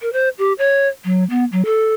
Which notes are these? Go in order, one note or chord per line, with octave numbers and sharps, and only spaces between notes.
A#4
C5
G4
C#5
F#3
B3
F#3
A4